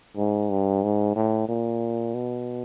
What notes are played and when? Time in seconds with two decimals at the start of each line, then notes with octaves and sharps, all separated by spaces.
0.17 G#2
0.50 G2
0.83 G#2
1.16 A2
1.49 A#2
2.14 B2